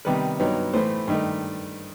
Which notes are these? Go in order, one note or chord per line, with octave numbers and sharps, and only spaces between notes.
C3 D#3 G3 B3 B4
G2 F#3 B3 D#4
A2 E3 A3 C5
G2 D#3 A3 D#4